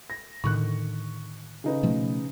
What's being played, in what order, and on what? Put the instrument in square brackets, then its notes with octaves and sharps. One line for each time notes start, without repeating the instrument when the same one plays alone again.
[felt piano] A#6
[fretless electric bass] A2 D3 D#3 [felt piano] C#6 F#6
[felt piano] C#3 D#4 B4
[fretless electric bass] B2 F3 A3